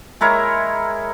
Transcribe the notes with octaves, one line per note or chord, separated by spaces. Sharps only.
G#3 E4 A#4 C#5